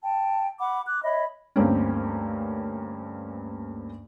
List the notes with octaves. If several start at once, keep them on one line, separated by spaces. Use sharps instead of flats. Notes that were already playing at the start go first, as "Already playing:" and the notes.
G5 A5
F#5 B5 D6
D6 F#6
C#5 D#5 E5 B5
D2 G2 A#3 C4 C#4